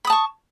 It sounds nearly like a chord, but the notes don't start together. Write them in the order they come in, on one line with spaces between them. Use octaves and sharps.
B5 D#6 A5 C#6